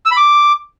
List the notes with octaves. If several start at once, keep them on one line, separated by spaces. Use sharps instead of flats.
E6
B5
D6